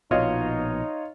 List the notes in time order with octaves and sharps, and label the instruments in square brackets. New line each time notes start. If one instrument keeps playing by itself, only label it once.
[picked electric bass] A#1 B2 [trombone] D#4 [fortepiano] F4 C#5 D#5